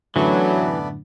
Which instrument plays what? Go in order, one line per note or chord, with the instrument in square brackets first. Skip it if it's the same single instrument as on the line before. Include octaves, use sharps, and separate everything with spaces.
[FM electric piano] F#2 A2 D3 [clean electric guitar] E3 [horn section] F#3 [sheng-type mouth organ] A3 B3 D5